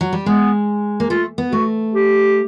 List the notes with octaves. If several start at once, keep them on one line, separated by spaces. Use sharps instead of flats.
F#3
G3
G#3 B3
A#3
A3 F4
B3
A3 F#4
G4